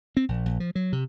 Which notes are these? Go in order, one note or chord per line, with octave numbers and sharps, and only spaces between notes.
C4
A#1
A#1
F3
F#3
C3